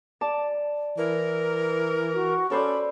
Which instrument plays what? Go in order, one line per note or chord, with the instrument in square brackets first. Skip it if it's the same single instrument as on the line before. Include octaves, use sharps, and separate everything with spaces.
[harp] D5 A5
[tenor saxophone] E3 [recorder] A#4
[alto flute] F#4
[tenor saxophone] C#4 [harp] A4 C5 D5 [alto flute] B5